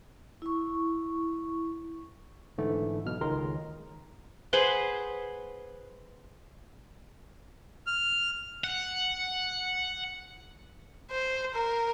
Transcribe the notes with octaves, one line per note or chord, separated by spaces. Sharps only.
E4 C#6
G#2 D3 E3 A3
B1 B2 F6
C#2 D#3 G#3 A#4 A#5 C6
G#4 B4 C5 F#5
F6
F#5
C5
A#4